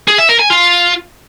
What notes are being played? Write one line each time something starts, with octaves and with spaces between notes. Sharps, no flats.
G#4
E5
A#4
G#5
F4